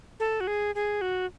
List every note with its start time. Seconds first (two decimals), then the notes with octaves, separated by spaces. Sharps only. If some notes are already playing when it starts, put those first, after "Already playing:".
0.20 A4
0.40 F#4
0.47 G#4
0.75 G#4
1.01 F#4